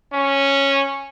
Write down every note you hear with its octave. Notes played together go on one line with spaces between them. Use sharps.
C#4